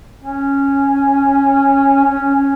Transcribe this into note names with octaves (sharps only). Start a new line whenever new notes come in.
C#4
C#4
C#4